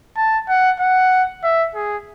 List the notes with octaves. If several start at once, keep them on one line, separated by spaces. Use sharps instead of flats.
A5
F#5
F#5
E5
G#4